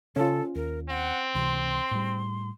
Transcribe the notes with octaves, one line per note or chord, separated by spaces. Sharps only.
C#3 C#4 F4 A4
D#2 A#4
C4 F#5
C#2 C3 E3 C6
A2 G3